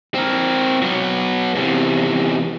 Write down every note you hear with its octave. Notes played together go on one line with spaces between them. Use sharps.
C4 A#4
F#3 B3
E2 C3